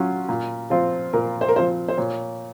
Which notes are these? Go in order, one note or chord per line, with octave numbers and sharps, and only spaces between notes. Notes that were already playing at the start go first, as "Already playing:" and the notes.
Already playing: F#3 C#4 F4
A#2
F3 C4 F4
A#2 A#4
C5
A#4
F3 C4 F4 C5
C5
A#2 C#5